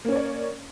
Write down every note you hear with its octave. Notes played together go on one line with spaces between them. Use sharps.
A#3 C#4 C#5 D5